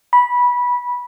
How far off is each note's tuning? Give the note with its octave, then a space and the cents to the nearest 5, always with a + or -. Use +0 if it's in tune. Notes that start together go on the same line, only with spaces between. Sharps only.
B5 -15